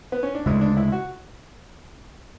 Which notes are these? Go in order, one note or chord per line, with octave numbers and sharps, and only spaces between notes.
B3
C#4
D4
D2 C#3 G#3 E4
D4
E4
F#4